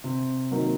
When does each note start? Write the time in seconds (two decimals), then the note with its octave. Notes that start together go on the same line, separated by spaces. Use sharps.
0.04 C3
0.51 D#3 F#3 A#3 D#4